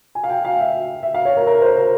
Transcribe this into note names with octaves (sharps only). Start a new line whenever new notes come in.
G#5
F5
G5
F5
E5
E5
F5
C#5
A#4
A#4
C5
A#4